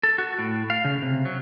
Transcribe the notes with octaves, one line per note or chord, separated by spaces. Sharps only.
A4
F#4
A2
F5
C#3
C3
F#3